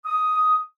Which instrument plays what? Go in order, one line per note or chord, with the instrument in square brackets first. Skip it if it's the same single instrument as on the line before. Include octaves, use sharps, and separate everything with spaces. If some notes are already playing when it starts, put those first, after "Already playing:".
[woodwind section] D#6